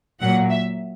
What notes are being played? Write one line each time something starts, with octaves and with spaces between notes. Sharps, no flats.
A#2 F#3 F#5
E5